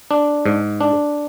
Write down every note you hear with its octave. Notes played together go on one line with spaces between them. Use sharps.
D4
G#2
D4